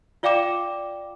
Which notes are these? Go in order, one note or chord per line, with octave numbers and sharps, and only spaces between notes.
F4 D5 F5 G5 D6 E7